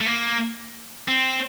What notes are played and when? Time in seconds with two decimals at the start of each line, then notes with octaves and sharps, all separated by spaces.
0.01 A3
0.07 A#3
1.08 C4